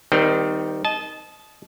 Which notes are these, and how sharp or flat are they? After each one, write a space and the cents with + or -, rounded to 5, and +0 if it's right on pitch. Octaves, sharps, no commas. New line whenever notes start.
D#3 +5 G3 +0 C4 -30
D#5 +0 A5 -25